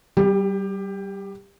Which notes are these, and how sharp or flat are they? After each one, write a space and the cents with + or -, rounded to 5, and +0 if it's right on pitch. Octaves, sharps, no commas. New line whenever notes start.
G3 -25 G4 +20